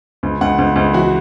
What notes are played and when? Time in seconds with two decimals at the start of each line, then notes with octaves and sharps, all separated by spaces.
0.23 C#2
0.41 C#2 F#5
0.58 C#2
0.76 C#2
0.93 E3 F#4